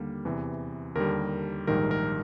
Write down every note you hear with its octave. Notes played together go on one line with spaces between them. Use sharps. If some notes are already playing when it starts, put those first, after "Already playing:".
Already playing: D#2 D3 G3 A#3
E2 C3 E3
D#2 D3 G3 A#4
A#1 G#2 D#3 G3 A#4
A#4